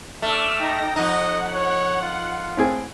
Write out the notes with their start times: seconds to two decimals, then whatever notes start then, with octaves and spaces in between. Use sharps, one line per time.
0.22 A3 D4 D6 E6 F6
0.59 D#4 G5 A#6
0.96 F2 D#4 D#5 F#5
1.54 C#5
2.02 F4
2.57 A2 C4 G#4